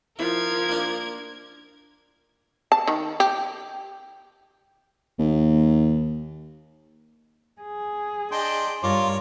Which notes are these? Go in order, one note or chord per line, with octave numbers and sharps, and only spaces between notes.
F3 E4 A#4 G#6
A#3 D4
A5
D#3
G4
D#2
G#4
D4 D#5 G5 C6
G2 F4 A#4 C#5 C6 D6